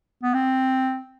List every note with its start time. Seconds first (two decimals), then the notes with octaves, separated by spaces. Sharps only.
0.23 B3
0.34 C4